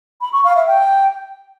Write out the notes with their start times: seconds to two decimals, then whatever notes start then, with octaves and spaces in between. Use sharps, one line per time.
0.21 B5
0.32 C#6
0.44 F5
0.55 E5
0.67 G5